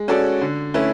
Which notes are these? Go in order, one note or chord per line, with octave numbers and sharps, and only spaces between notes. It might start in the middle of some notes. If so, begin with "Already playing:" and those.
Already playing: G#3
C#4 F#4 A4 D5
D3
A3 C#4 E4 B4